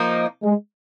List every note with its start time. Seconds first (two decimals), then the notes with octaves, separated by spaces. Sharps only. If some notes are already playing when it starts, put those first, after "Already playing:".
Already playing: F3 A#3 D#4
0.43 G#3